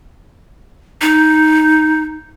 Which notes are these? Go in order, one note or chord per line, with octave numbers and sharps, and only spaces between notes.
D#4